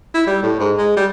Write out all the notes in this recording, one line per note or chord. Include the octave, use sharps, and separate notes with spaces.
E4
G3
A2
G#2
G#3
G3